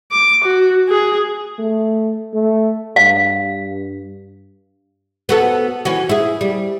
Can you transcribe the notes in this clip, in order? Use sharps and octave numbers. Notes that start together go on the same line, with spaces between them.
D6
F#4
G#4
A3
A3
G2 F5
B3 F#4 A4
E3 C#4 F#4
E4 G#4
G3